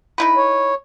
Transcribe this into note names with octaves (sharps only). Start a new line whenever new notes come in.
D#4 E4 B4
C#5